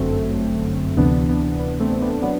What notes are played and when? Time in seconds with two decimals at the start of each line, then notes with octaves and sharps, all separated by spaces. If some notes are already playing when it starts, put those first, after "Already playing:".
Already playing: G1 F#2 D3 F#3 A3 C4
0.97 D2 C3 E3 B3 D4
1.29 B3
1.60 B3
1.80 A3 C4
2.02 B3 D4
2.22 F#3 B3 D4